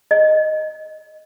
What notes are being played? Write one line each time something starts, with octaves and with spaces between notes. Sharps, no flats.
D#5